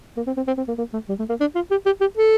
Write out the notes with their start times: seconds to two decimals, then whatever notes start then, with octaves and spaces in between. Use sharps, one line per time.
0.17 A#3
0.27 C4
0.37 C4
0.47 C4
0.57 C4
0.68 A#3
0.78 A#3
0.93 A3
1.09 G3
1.19 A3
1.29 A#3
1.40 D4
1.55 F4
1.71 G4
1.86 G4
2.01 G4
2.17 A4